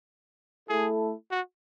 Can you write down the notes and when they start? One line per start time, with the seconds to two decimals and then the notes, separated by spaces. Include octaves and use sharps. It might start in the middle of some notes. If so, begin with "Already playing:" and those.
0.68 A3 E4 G#4 A4
1.31 F#4